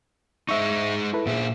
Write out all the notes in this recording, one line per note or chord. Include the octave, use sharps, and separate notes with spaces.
G#3 D#4 E5 C#6
E4 A4 B4
A#2 G#4 E5